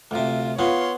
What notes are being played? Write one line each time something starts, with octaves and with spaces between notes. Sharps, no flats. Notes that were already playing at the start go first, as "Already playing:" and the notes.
D2 C3 F4
B3 F4 C#5 C6